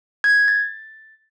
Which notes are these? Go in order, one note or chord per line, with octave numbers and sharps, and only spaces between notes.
G#6
A6